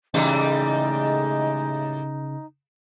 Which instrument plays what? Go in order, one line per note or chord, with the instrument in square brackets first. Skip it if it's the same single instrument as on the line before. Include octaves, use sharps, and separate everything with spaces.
[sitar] A2 E3 G3 [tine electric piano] C#3 [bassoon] G#3 [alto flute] D#4